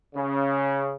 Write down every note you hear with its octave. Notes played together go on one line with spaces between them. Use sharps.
C#3